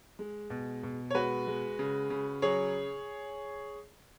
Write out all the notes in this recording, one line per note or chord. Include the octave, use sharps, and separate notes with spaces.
G#3
B2
B2
C#5
G#3 F#4 B4
G#3
C#3
C#3
F#3 G#4 C#5